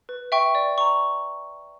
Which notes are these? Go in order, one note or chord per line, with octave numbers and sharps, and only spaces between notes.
B4
E5 G5 C#6
D5
A#5 C#6